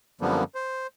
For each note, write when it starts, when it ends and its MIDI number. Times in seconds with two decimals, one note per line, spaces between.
0.21 0.44 42
0.21 0.44 50
0.21 0.44 53
0.21 0.44 55
0.21 0.44 58
0.21 0.44 59
0.55 0.87 72